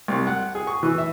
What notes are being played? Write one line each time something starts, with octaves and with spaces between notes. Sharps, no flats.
C2
F#5
G#4
C#6
E3
E5